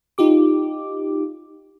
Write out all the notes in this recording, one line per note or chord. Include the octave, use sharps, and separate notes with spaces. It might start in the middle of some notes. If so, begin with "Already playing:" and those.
D#4 F4 G4 D6